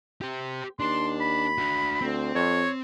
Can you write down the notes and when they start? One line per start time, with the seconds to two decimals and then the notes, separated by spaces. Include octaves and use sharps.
0.22 G4 C5
0.79 D#2 D4 C6
1.21 B5
1.58 D4 F#4
2.01 D2 C4
2.35 F2 C#5